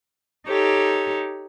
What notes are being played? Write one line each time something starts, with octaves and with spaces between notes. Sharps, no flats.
D#4 G4 A4 C#5